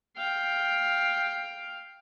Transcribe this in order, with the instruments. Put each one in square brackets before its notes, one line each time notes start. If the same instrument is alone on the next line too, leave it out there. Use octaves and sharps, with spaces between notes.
[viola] F5 G5